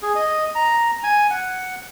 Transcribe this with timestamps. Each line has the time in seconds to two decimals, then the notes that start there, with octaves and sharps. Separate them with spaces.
0.02 G#4
0.15 D#5
0.55 A#5
1.04 G#5
1.31 F#5